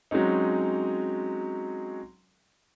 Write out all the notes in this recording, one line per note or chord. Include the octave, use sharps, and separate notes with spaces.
F#3 G#3 C4 C#4 D#4